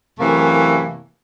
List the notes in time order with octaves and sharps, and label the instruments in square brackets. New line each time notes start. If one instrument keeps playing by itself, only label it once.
[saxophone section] F#2 C3 E3 A3 A#3